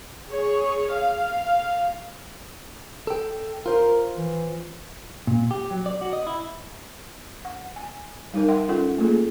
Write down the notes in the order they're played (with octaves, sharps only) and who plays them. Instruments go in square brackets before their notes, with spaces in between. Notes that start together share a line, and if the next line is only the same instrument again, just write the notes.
[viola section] G#4 C#5
F5
[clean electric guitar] A4 G5
[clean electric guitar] F4 C5 [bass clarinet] A#4
[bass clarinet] E3
[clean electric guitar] A#2
G4
F#3
D5
F#4
D#5
E4
[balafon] F#5
G#5
G3 D#4 A#4
E5 F#5 G5 C6
C#4 F4 A4 F#5
A3 A#3 F4 G#4 A4